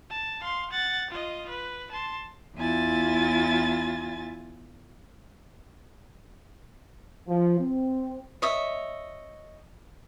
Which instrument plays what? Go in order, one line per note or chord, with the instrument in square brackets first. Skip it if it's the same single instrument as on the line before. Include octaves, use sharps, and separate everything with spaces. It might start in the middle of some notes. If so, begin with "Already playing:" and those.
[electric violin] A5
F5 C6
F#5 A6
F4 D#5
B4
A5 C6
[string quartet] E2 E4 F4 G#5 A6
[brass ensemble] F3
C4
[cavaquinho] C#5 D#5 E5